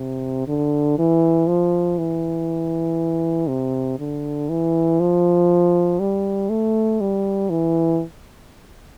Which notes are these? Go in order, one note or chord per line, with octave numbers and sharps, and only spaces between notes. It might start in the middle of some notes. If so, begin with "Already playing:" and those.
Already playing: C3
D3
E3
F3
E3
C3
D3
E3
F3
G3
A3
G3
E3